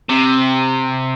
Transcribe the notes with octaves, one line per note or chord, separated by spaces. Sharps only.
C3